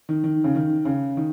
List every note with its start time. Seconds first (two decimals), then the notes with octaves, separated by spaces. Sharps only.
0.09 D#3
0.24 D#3
0.44 C#3
0.56 D#3
0.85 C#3
1.17 D#3